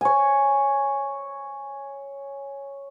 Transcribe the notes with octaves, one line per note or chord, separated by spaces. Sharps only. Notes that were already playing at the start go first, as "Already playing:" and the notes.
C#5 G#5